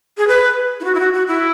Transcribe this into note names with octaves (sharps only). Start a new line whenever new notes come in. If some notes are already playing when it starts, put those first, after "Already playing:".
G#4
B4
E4
F#4
E4
F#4
F#4
E4